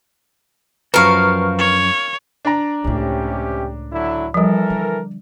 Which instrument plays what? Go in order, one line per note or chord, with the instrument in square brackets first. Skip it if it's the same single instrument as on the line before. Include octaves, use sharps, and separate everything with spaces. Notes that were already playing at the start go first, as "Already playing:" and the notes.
[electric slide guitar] F#2 F3 F#4 [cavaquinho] A#4 F5 [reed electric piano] B4 A#5 C#6
[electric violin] C#5
[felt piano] D4 D5 A#5
[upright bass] C#2 A2 [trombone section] C3 C#4 G4
[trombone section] D3 F#3 E4
[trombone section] E3 A4 A#4 [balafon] F3 G3
[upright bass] D3